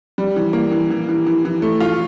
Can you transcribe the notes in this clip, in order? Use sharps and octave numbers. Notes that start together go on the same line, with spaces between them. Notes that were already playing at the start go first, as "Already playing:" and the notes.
G3
E3
A#3
E3
E3
E3
E3
E3
A3
F4